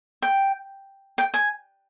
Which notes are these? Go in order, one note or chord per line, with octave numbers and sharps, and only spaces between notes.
G5
G5
G#5